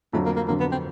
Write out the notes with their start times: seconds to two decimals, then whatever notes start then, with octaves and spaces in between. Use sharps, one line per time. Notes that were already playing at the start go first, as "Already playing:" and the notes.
0.13 F2 D3 F#3 A3
0.26 A#3
0.36 A#3
0.48 F2 D3 F#3 A#3
0.60 B3
0.72 C4